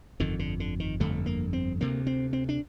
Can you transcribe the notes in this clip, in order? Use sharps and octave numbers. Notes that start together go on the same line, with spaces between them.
G1 F2 D3 D#3
D3
D3
D#3
G1 F2 D3 A3
A#3
C4
D2 C3 A#3
C4
C4
D4